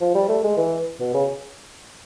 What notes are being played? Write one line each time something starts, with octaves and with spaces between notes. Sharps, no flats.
F3
G3
A3
G#3
E3
B2
C#3